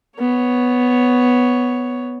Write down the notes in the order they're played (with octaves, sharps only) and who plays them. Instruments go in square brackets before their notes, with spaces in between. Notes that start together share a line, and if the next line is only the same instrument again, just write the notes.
[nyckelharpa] B3 C#5